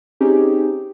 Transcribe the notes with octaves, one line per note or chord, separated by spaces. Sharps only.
C4 C#4 D#4 G4 G#4